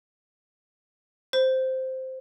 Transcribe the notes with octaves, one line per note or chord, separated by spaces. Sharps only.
C5